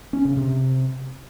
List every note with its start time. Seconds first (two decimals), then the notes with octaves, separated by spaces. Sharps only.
0.13 C#4
0.25 C#3
0.37 C3